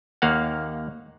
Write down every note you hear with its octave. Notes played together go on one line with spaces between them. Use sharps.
D#2 A#3 F5 F#5